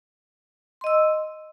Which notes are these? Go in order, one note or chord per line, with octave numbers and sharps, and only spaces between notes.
D#5 C6 E6